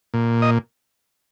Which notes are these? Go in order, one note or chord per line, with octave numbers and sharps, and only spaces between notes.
A#2
D#5